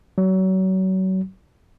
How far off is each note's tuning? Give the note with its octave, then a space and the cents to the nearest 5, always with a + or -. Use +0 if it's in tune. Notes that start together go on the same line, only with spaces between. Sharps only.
F#3 +30